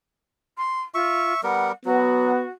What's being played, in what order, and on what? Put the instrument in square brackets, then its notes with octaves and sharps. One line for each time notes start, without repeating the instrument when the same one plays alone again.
[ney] C6
[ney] F4 [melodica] E5 C#6
[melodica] G3 B3 A#4 [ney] F#5
[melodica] F#3 [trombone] B3 [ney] F#4